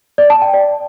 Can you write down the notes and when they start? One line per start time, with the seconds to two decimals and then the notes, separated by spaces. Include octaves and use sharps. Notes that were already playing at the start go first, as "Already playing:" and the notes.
0.18 D5
0.30 A5
0.42 G5
0.54 D5